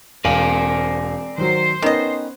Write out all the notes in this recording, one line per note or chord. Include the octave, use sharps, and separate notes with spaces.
E1 C4 A#4 D5 F5 G#5 F#7
D#3 F#3 C5
D#3 B3 C#4 D#5